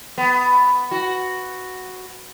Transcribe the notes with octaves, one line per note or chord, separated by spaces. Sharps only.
B3
F#4